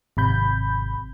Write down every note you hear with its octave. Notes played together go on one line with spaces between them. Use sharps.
G#1 C3 B5 G6